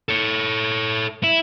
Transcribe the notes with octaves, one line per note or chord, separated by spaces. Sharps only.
A4 C#5
E4